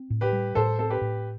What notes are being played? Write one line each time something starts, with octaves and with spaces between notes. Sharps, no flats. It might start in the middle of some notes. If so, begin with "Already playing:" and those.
Already playing: C4
A2
G4 B4
G3
A2 A4 C5
C4 A4
G4 B4
A2